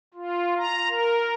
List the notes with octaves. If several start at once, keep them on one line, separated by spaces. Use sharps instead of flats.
F4
A#5
A#4